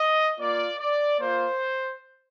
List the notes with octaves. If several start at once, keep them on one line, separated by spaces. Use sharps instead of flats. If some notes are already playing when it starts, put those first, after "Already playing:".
Already playing: D#5
A#3 F4 D5
D5
A#3 F4 C5